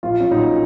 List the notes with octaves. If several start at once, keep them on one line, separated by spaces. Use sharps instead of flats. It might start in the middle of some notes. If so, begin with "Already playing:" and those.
A#1 F4
C#4
A#2 F#3 D#4